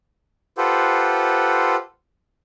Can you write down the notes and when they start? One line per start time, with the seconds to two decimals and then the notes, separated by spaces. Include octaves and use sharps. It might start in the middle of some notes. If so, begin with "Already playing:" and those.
0.58 F4 G4 A4 B4 C5 F#5